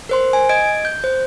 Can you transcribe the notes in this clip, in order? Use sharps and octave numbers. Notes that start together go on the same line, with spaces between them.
A#4 C5 C6
G#5
D#5 G#6 D7
G6
C5